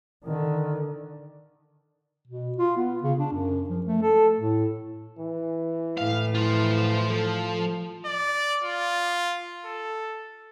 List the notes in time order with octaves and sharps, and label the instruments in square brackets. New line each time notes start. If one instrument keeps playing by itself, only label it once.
[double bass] D3 D#3
[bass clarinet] B2
F4
B3
C#3
D4
F#2
F3
A3
A4
A2
[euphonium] E3
[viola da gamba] A2 [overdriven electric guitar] F5
[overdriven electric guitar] F4 C5
[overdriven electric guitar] F3 [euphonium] A4
[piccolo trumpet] D5
F4
A4